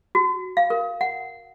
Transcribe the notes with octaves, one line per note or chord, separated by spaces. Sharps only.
F#4
F5
A#4
F#5